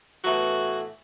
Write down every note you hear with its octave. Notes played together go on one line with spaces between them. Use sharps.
A2 E3 A3 B3 F#4